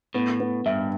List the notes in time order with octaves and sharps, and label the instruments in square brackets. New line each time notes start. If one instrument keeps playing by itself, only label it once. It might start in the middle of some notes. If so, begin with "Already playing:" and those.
[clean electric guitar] A2 [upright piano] B3
[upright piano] B3
[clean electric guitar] G2 [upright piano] E5